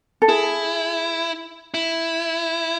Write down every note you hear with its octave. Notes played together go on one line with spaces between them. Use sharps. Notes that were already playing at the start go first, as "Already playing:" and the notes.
A4
E4 G#4
E4